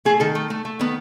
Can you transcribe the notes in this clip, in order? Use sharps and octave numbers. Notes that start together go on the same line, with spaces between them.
A3 G#4
D#3 A4
A3
A3
A3
D#3 B3